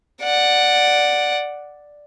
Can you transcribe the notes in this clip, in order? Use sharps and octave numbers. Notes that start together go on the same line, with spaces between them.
D5 F#5